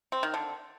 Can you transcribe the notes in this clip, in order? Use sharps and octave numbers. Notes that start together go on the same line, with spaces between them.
C4
D#3
D3